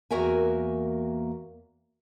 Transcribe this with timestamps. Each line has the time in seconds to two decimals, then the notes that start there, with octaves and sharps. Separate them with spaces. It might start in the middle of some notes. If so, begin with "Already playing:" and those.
0.11 E2 A#3 F#4 A#4 E5 G#5